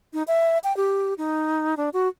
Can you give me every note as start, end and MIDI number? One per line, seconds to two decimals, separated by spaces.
0.13 0.23 63
0.28 0.58 76
0.64 0.75 79
0.77 1.14 67
1.18 1.75 63
1.77 1.89 62
1.93 2.08 66